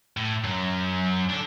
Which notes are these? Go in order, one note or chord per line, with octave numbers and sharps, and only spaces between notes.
A2
F#2 F#3
D4 A4